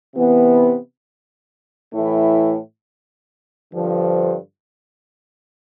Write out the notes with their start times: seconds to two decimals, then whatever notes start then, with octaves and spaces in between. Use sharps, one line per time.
0.14 C3 E3 B3
1.93 A2 E3 A3 E4
3.73 G2 D3 F3